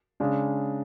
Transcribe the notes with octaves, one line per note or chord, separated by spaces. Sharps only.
C#3 G#3 D4